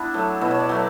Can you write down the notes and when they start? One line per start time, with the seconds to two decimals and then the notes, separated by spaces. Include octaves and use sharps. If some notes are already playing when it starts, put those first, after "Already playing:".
Already playing: B3 D4 E4
0.14 F#3 A3
0.41 B2 E4
0.51 C#5
0.60 D5
0.69 F#3 A3